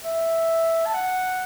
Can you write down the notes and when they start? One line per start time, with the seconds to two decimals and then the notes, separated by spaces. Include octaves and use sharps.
0.04 E5
0.86 A5
0.94 F#5